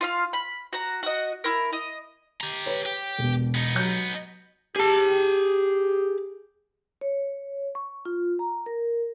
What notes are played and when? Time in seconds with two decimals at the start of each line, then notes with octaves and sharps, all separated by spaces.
0.01 F4 F5 F6
0.33 B5
0.73 F#4 A#5
1.03 F#4 D#5
1.44 E4 A#4
1.73 D#5
2.41 G4 A#5
2.66 B4 C#5
2.86 G4
3.19 E1 B2
3.55 B3 D#4
3.76 F#3 A#5 G6
4.76 G4 G#4 A5
7.01 C#5
7.75 C#6
8.05 F4
8.39 A#5
8.66 A#4